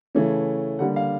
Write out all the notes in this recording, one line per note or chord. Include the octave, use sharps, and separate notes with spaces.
C#3 E3 A3 C#4
D3 G3 A#3 F#5
F5